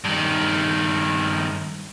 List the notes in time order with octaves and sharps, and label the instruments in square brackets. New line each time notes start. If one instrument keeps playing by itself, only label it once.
[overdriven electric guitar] G2 D#3